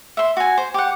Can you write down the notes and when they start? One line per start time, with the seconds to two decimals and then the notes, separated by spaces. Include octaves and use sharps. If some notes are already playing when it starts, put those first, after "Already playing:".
0.17 E5 C6
0.37 F#4 G#5
0.58 C5
0.74 G4 F#5